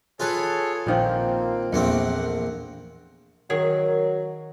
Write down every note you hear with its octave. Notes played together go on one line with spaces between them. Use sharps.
F4 G#4 A4 B4 C#5
A#1 A#2 D#3 F3 A#3 C4
A#1 E2 A3 A#3 C4 F#5
D#3 F#3 G#4